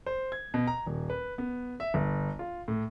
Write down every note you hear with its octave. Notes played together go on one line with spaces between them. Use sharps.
C5
G#6
B2
A#5
D#1
B4
B3
E5
G1
F4
A2